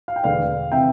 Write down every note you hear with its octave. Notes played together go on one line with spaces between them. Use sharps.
F5
G5
E1 E2 D3 A3 D5 F5
C3 E3 E5 G5